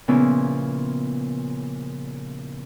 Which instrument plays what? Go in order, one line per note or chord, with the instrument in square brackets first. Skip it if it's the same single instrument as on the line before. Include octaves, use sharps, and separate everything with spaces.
[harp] A#2 C#3 F3 B3 C#4 E4